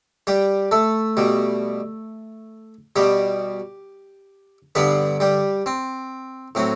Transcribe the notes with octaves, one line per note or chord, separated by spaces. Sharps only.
G3 G4
A3 A4
B2 G3
B2 G3 G4
G2 D3 G3 B3 B4
G3 G4
C4
A2 F#3 C4